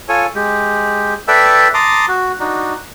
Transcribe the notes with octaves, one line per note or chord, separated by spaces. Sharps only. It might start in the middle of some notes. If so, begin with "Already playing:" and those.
F4 A4 C#5 G#5
G#3 G4
A4 B4 D5 E5 G5 E6
A5 A#5 C6 D6 D#6
F#4
D4 D#4 F#4